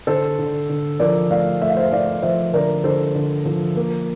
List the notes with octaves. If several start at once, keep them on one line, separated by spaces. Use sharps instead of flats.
D3 A4 C5
D3
D3
F3 A#4 D5
A3 D5 F5
A3 E5
F5
C5 E5
A3 D5 F5
F3 C5 E5
D3 A#4 D5
D3 A4 C5
D3
F3
A#3